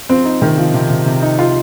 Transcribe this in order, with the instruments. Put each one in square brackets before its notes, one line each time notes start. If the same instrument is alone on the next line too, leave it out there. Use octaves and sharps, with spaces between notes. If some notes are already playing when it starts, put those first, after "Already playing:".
[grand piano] F3 [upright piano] C4
[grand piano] D#4
[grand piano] C3 [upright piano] D#3
[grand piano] F3
C3
C3
C3
D#4
[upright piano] F4